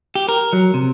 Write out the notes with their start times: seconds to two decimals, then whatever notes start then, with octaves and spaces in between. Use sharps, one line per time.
0.15 G4
0.29 A#4
0.53 F#3
0.74 C3